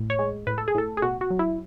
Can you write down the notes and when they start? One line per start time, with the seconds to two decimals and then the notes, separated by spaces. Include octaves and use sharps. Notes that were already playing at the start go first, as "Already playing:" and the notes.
Already playing: A2
0.10 C#5
0.19 G#3
0.47 A2 B4
0.58 A4
0.68 G#4
0.75 A2 A4
0.97 G#4
1.02 B2 F#4
1.21 F#4
1.30 F#3
1.39 E4